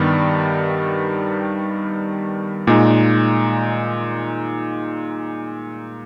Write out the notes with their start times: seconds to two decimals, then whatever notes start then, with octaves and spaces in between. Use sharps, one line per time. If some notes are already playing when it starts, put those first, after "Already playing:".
Already playing: G2 D#3 G3 B3
2.67 A#2 G#3 D#4